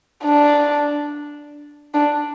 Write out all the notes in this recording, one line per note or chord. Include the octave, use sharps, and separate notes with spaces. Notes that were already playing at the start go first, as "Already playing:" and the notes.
D4
D4